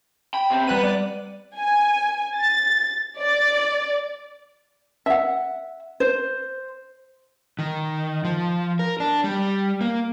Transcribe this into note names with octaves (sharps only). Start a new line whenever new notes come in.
G5 B5
C3 C4
G3 B3 F#6 D#7
D5
G#5
A6
D5
E5 F#5
C5
D#3
F3
A#4
D4
G3
A#3